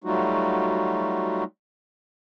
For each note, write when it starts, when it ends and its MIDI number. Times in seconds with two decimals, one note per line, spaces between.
0.04 1.44 54
0.04 1.44 55
0.04 1.44 57
0.04 1.44 63
0.04 1.44 65
0.04 1.44 66